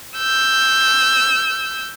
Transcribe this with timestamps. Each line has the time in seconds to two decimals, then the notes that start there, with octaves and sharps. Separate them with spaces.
0.18 E6 G6